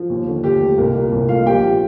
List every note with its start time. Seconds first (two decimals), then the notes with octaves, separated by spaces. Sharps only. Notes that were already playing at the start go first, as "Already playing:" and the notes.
Already playing: F3
0.10 D#2
0.27 D3
0.44 D#2 G4
0.62 A3
0.78 C2 A#3 A#4
0.95 A#2
1.12 C2
1.29 A3 F4 F5
1.46 A#1 G4 G5
1.63 A#2